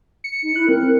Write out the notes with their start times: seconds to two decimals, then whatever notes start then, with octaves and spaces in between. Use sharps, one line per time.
0.24 C#7
0.43 D#4
0.56 E4 F#6
0.69 C4 A#4